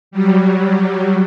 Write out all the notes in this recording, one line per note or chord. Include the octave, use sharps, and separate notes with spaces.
F#3 G3